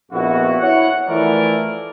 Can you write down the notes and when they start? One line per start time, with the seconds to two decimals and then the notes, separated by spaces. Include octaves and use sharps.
0.12 A#1 F2 B3 E4 F#4
0.59 E4 C#5 F#5
1.08 E3 F3 A3 E4 A#4 D5